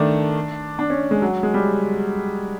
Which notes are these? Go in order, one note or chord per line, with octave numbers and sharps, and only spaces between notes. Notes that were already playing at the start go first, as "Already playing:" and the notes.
Already playing: D#3 A3 D4
D4
C#4
G#3
F#3
G#3
G3